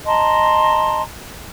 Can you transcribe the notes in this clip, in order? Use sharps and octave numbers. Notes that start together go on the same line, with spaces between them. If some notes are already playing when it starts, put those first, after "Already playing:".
D#5 A5 A#5 C6